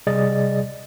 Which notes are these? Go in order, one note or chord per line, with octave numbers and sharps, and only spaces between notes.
C3 G3 G#4 D5 D#5 A6